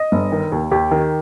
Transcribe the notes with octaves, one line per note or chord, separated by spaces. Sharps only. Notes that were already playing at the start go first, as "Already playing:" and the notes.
Already playing: D#5
G1
D#3
D#2
D#2 G4
D#3